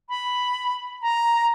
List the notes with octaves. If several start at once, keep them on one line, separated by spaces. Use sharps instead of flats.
B5
A#5